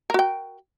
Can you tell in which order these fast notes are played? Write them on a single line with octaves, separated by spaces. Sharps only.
A#4 F#4 G5